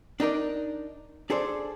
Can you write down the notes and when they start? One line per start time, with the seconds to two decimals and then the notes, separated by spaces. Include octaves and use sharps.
0.20 D4 D#4 A#4 D5
1.30 D4 G#4 A4 C5 D5